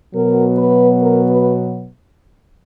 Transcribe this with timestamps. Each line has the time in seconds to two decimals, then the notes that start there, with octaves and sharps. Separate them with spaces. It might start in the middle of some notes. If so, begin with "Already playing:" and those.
0.14 B2 F#3 B3 A#4
0.57 B4
1.01 A#4
1.30 B4